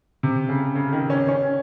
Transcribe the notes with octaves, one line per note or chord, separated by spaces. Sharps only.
C3
C#3
C#3
D#3
C#4
C#4